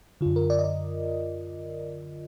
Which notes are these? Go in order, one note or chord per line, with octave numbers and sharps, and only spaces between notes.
F#2 D3 F4
A#4
D5
D#5
D5